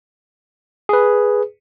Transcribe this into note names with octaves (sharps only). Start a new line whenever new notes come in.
G#4 B4